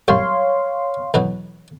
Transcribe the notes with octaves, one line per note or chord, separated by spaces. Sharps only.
A#1 F#2 G3 C#5 F5 C6
E2 B2 F#3